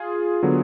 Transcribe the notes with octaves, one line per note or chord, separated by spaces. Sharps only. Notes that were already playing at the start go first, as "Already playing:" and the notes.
Already playing: F4 G#4
D3 F#3 B3